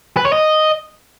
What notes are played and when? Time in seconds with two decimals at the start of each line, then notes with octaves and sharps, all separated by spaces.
0.17 B4
0.25 C#5
0.33 D#5